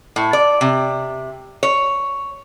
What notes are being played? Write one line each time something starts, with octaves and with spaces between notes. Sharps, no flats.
A2
D5
C3
C#5